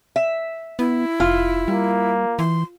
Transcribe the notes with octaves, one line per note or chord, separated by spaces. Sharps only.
E5
B3 E4
F1 F4
G3 A#3
E3 C6